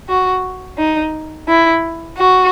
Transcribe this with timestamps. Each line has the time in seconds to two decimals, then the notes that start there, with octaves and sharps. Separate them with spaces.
0.09 F#4
0.78 D#4
1.48 E4
2.17 F#4